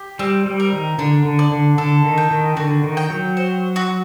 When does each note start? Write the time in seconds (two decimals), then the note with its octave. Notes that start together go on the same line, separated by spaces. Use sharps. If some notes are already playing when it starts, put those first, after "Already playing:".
Already playing: G4
0.19 G3 C4
0.46 G3
0.60 A#4
0.73 D#3
0.98 D3 D4
1.25 D3
1.39 D5
1.52 D3
1.78 D3 A4
2.04 D#3
2.18 G5
2.31 D#3
2.57 D3 F#4
2.84 D#3
2.97 G5
3.10 F#3
3.37 C5
3.76 F#4